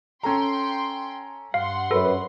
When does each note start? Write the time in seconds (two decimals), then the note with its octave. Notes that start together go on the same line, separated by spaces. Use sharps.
0.23 C#4 A4 G5 A#5 C6
1.54 G2 F5 F#5 C6
1.91 F#2 A4 B4